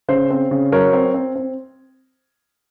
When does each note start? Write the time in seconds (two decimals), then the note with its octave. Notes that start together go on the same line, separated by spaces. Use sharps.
0.08 C#3 C5
0.30 C4
0.51 C#3
0.72 F#3 A#4 C#5
0.93 C4
1.14 C4
1.36 C4